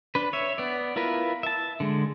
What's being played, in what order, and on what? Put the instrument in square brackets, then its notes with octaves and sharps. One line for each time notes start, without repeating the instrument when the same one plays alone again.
[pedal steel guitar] D4 B4
C#5 E5
B3 D5
E4 F4 A#4 B4
E5 A5
D3 G#3